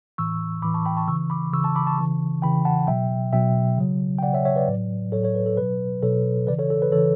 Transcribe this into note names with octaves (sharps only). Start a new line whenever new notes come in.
A2 E3 C#6 E6
A2 E3 B5 D6
A5 C#6
G5 B5
A5 C#6
C#3 E3 C#6 E6
B5 D6
C#3 E3 C#6 E6
A5 C#6
B5 D6
A5 C#6
C#3 E3
C#3 E3 G5 B5
F#5 A5
B2 F#3 E5 G5
B2 F#3 E5 G5
C#3 F#3
G5
C#3 F#3 D5 F#5
C#5 E5
C#5 E5
B4 D5
A2 F#3
A2 F#3 A4 C#5
A4 C#5
B4
A4
B2 F#3 B4
B2 F#3 A4 C#5
C#3 E3 B4 D5
A4 C#5
A4
B4
C#3 E3 A4 C#5